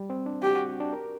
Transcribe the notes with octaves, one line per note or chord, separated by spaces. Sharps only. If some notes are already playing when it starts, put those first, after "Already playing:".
Already playing: G3
C4
D4
F#4 G4
F#4
D4
A#4